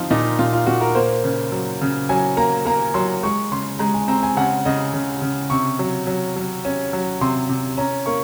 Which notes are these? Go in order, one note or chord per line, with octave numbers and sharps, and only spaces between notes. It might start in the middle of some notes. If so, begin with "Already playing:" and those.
Already playing: F3 C4 D#4 F4
A#2 D#4
A#2 F4
F4
A#2 F#4
A#4
A#3 C5
C#3
F#3
C#3
F#3 G#5
A#3 A#5
A#3 A#5
F#3 C6
G#3 C#6
C#3 C6
G#3 A#5
G#5
C4 A#5
G#5
C#3 F#5
C#3 D#5
C#3
C#3
C3 C#6
F#3
F#3
F#3
C#4
F#3
C3 C6
C3
C#4 A#5
A#3 C#6